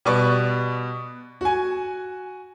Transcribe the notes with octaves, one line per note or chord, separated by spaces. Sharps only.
B2 G3 B4 D5 C#6
F#4 G#5